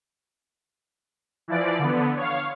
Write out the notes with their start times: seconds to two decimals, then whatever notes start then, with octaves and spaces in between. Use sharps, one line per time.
1.48 E3 F3 D5
1.79 D3 B3
2.17 C#5 F5